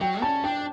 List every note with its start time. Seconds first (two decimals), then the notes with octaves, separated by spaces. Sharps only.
0.01 F#3 G5
0.22 C#4 A5
0.44 D4 G5